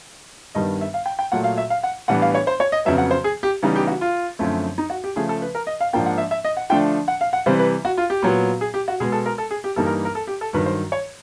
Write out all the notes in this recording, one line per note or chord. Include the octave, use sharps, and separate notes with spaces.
G2 D#3 G3 B3 D#5
E5
F5
G5
G5
A#2 F#3 A3 F#5
F5
E5
F5
F#5
A2 E3 G3 B3 D4 F#5
F5
C#5
C5
C#5
D#5
F2 C#3 F#3 B3 E5
F#5
C5
G#4
G4
C#3 E3 G3 B3 D#4
G4
F#4
F4
F#2 D3 F3 A3 C4
D#4
F#4
G4
C#3 F3 A3 G#4
A4
B4
A#4
D#5
F5
G#2 F3 A#3 D4 G5
F#5
E5
E5
D#5
F#5
D3 F3 A3 D4 G5
F#5
F5
F#5
C3 E3 G3 C5
B4
F#4
F4
G4
A#2 F#3 B3
G#4
G4
F#4
B2 G#3 B3 G#4
A4
A#4
A4
G#4
G4
G2 E3 G3 A#3 D#4 A4
A#4
A#4
A4
G4
A4
G2 D#3 F#3 B4
C5
C#5